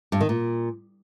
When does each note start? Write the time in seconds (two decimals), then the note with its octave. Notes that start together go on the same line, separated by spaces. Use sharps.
0.12 G2
0.21 D#3
0.29 A#2